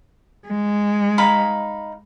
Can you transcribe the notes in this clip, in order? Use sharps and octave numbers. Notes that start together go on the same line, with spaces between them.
G#3
D#4 F5 B5